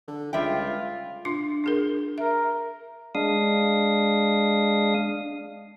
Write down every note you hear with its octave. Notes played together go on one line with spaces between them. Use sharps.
D3
C#2 G3 F4 E5 G5
D4 F4 C6
D4 G#4 A#4
A#4 E5
G#3 D4 F5 D#6